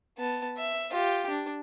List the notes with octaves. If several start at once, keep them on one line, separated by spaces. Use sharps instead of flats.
B3 A5
E5
F4 G4
D4